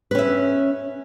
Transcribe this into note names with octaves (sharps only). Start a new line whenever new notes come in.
C#4 B4 E5